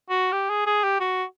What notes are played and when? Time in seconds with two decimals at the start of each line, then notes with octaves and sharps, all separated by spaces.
0.10 F#4
0.32 G4
0.50 G#4
0.66 G#4
0.84 G4
1.00 F#4